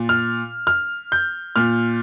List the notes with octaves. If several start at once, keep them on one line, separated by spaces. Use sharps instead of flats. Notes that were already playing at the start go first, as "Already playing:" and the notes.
Already playing: A#2
F6
F6
G6
A#2 F6